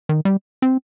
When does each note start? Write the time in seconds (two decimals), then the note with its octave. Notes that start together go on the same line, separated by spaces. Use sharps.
0.09 D#3
0.25 G3
0.62 C4